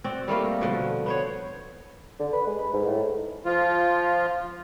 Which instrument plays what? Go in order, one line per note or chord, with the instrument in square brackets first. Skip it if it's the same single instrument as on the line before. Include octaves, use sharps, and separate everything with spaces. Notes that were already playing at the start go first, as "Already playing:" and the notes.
[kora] C4 F#4 D5
G3 A3 A#3 F4
B2 D3 F3
B3 C5 C#5
[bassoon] D3
B4
G#3
B4
G#2
A2
[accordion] F3 F4